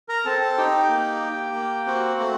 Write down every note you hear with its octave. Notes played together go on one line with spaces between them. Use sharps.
A#4 A#5
C4 A4 A5
A4 A5
D#4 G4 G5
A#3
G4
A#3
C4 F#4 F#5
A3